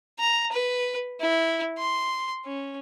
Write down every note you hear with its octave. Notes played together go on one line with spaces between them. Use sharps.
A#5
B4
E4
C6
C#4